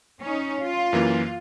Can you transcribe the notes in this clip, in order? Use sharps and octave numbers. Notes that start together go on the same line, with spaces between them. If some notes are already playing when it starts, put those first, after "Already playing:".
C#4 D#4
F4
F#2 E3 A#3